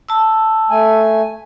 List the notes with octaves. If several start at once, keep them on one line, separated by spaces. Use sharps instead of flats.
A5 E6
A3 G#5